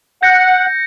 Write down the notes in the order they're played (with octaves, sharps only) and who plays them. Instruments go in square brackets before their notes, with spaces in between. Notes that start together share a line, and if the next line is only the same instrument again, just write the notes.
[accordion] F#5 [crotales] G6 A#6 C#7